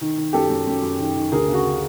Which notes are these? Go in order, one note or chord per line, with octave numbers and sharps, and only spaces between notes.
D#3
D#3
F#2 G4 A4
F#2
F#2
F#2
D#3
D#3
D2 G#4 A#4
C#3
F#4 G#4